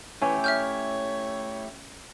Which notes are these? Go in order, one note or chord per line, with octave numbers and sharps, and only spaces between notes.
E3 A3 C#4 E4 G4
C#5 E5 F6 G6